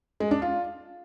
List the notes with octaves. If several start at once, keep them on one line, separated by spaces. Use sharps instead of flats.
G#3
D4
F4